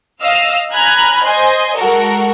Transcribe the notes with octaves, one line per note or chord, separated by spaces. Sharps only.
D#5 F5 E6 F6
G#5 A#5 B5 F6 F#6 G#6
C5 D#5 G#5
G#3 F#4 A4 A#4